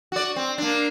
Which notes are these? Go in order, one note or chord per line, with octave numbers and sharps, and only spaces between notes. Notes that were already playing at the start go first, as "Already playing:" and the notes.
F#4 D5
C4
A#3 D4